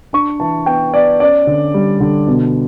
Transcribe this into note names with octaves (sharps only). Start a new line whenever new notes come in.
D4 C#6
E3 A5
B3 G5
B3 D5
C#4 D5
D3
G3
D3
B2